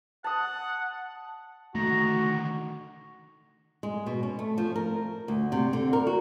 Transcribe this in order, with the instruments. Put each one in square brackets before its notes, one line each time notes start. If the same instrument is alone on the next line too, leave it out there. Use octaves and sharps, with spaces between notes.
[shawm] F#5 [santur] A5 D#6
[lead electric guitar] D3 D#3 [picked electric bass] A3 [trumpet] F#4 [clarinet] A#5
[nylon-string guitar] G#3
B2
C#4
A3
F3
A#4
D2
C3
D3
A#4
F#4